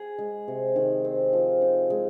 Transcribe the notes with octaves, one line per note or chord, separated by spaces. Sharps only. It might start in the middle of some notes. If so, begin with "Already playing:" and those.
Already playing: G#4
G#3
C3
D#3
C4
F3
D#4
G#3